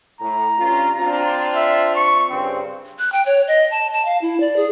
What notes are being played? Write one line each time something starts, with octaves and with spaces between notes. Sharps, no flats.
A2 A#5
G2 C#4 F4
C4 D4 F4
E5
C#6
G2 C#3 C4
F#6
G5
C#5
D#5
A5
A5
F5
E4
D5
G#4